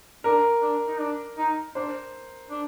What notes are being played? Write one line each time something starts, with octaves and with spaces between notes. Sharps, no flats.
D4 A#4
D4
D#4
D4
D#4
D4 C5
D4